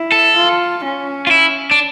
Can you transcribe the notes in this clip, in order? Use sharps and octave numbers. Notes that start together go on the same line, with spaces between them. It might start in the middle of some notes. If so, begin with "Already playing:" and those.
Already playing: E4
A4
F4
C#4
F4
E4
D4